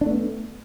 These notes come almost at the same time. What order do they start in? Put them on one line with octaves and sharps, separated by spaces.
D4 A3 B3